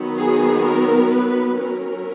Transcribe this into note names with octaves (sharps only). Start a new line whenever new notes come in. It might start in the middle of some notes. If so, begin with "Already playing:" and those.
Already playing: D#3 F#3 B3
G#4
A#4
B4
F#3 C#4 A#4